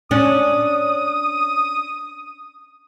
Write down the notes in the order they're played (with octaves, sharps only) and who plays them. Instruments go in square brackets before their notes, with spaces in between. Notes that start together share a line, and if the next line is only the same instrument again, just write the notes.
[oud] C#4 D4 [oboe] D#6